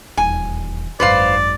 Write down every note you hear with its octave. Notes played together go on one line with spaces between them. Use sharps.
D#1 E2 G#5
G#1 F#2 B4 C5 D5 F5